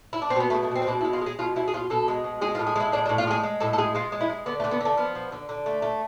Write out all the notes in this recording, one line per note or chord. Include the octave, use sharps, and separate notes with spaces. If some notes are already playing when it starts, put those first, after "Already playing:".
E4
D4
C4
B2 B3
A3
G#3
A3
B2 C4
C4
B2 D4
E4
G#3
F4
G#3 G#4
B2 F4
B2 E4
G#4
B2 F4
B2 A4
G#3
B2
G#3 G#4
F4
A2
G#4
G#3 E4
A2 D4
D4
A2
F4
G#3 G#4
G#3
A2 A4
A4
G#3 G#4
G#3 F4
G#3
E4
G#3
D3 B3
A3
D3
B3
D3 A3
F3 B3
F3
D3
D3
A3
A3